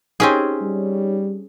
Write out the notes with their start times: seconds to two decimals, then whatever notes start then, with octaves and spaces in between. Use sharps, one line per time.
0.20 C4 C#4 D#4 G4 G#4 C#5
0.61 G3